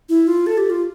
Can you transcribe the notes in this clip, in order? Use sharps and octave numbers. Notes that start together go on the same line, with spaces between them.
E4
F4
A4
G4
F4